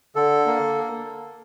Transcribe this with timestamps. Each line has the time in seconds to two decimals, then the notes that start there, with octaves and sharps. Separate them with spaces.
0.16 D3 A4
0.46 A#3